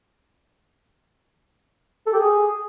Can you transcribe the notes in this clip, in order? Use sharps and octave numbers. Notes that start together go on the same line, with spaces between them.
A4
G4
G#4